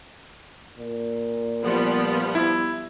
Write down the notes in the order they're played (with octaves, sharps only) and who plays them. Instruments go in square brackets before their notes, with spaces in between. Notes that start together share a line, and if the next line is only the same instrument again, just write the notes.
[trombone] A#2
[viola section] F3 G3 B3
[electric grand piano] E4